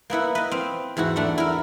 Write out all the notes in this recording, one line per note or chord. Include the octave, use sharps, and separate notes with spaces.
A#3 B3 E4 F#5
B4 D#5
C4 F5
E2 G#2 E4 F#4
A3 D4 F#5
E4 A#4